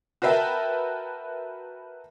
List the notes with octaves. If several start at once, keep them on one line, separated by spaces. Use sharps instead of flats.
F#4 A#4 B4 E5 G5 A5